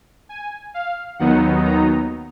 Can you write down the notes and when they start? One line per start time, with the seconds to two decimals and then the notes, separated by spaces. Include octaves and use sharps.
0.29 G#5
0.74 F5
1.19 D#2 D#3 F#3 B3 D#4 F#5
1.64 A#5